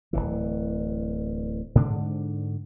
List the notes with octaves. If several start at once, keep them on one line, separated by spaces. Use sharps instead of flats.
D1 G#1 E3
G#2 D3 D4